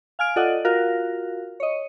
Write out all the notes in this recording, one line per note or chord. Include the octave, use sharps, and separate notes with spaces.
F5 G#5 F6 D7
F4 A4 D5 D#5 F#5
F4 F#4 A#4 F5
C#5 D#5